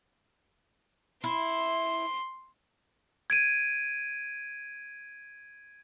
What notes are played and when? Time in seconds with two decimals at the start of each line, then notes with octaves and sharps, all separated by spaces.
1.24 E4 C6
3.30 G#6 D7 D#7